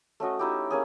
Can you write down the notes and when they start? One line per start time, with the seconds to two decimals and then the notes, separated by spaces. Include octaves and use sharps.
0.20 A3 C#4 F#4 D#5
0.39 D#4 E4 G4
0.71 A#3 C#4 G#4